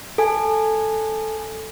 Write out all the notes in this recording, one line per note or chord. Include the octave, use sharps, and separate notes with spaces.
A4 G#5